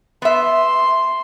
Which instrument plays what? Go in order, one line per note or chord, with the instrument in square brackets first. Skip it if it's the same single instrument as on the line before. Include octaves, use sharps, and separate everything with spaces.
[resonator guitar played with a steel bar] B3 E5 [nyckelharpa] C6